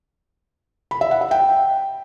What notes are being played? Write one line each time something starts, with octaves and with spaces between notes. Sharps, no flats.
B5
E5
F#5
E5
G5